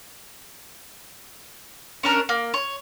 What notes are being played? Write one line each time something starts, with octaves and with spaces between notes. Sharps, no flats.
C#4 D4 A#4
A#3
C#5